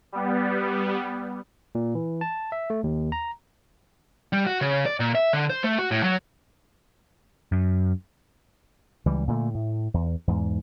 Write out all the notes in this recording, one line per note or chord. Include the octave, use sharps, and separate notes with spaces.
G3 B3
A#2
E3
A5
E5
A3
D#2
A#5
G3
F#4
C#3
D5
A#2
E5
D3
C5
A3
F#4
A2
F#3
F#2
C#2 E3 G3
A#2 D3 F#3 A3
A2
E2
E2 G#2